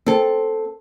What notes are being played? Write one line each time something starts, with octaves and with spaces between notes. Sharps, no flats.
C4 A4